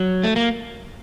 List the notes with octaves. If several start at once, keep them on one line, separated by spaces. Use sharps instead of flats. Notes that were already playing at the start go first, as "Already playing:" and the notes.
Already playing: F#3
A3
A#3